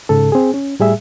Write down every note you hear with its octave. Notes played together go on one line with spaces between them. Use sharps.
G#2 C#3 A4
C4 G#4
C#4
A2 G3 G#4 E5